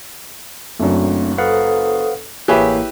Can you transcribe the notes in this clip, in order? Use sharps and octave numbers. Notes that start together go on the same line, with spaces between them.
F#1 F#2 A3 C4 D4
A4 B4 C5 F5 F#5 D#6
A1 A#3 E4 G4 G#4 B4 C#5 E5